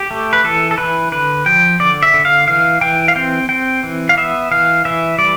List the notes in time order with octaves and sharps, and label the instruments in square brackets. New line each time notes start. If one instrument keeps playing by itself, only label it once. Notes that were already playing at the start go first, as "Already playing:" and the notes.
Already playing: [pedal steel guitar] G4
A3
B4
E3 A4
A4
E3 B4
D3 B4
F3 G5
D3 D5
E5
D3
F5
E3 F5
E3 G5
F5
C4 G5
C4 G5
E3
F5
B3 E5
E3 F5
E3 E5
G3 D5